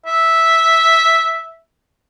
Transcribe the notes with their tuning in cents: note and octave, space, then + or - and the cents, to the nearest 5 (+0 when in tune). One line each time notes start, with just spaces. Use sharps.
E5 -5